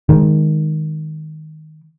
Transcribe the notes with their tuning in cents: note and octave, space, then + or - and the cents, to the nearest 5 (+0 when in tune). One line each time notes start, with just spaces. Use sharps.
D#3 +0 G#3 +0